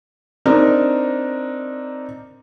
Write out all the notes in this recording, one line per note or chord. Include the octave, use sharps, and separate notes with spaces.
C4 D4 D#4 A#4